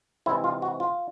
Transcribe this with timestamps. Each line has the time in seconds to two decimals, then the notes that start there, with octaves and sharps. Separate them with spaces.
0.26 C3 E3 G#3 C4 E4
0.44 F4
0.62 F#4
0.80 F4